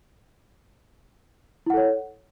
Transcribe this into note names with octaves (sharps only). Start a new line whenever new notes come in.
E4 A4 C#5 F#5